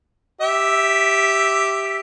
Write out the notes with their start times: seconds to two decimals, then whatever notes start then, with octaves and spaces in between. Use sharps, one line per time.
0.41 G4 E5